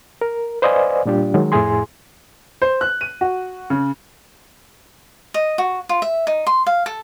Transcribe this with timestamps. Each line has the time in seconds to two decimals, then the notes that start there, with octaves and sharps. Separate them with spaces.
0.21 A#4
0.62 B4 C5 D5 D#5 F5 G#5
1.05 A#2 G3 D4 F4 G4
1.34 D#3 F#3 G#3
1.52 F2 A2 E4 G#4 G#5 C6
2.62 C5
2.81 F#6
3.01 D#7
3.21 F#4
3.70 C#3
5.34 D#5
5.58 F#4
5.89 F4
6.02 E5
6.27 D#4
6.47 C6
6.66 F5
6.86 A4